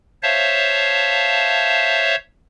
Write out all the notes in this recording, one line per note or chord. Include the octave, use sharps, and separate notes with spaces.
C5 C#5 E5 F5 A5